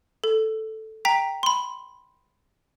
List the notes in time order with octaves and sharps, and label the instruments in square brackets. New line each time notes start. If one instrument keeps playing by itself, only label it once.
[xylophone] A4
G5 A#5 B6
B5 C6